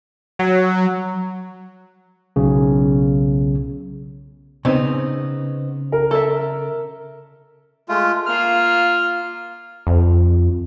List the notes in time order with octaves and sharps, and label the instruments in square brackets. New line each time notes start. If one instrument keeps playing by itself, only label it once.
[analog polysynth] F#3
[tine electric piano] B1 C#3
[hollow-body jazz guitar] C#3 [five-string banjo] B3 C4 D#4
[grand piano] A#4
[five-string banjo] A4 E5
[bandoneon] G#3 A3 F4
[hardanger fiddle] A#3 F4 [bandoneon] F6
[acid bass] F2